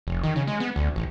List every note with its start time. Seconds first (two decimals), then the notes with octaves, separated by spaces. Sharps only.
0.07 F1
0.23 D#3
0.36 C#3
0.47 G#3
0.60 B3
0.76 D2
0.96 A1